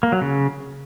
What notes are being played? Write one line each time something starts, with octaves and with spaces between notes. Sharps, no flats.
A#3
F#3
C#3